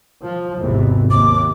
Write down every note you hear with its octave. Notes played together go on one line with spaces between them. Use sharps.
F3
G#1 E2 C3
D#2 D6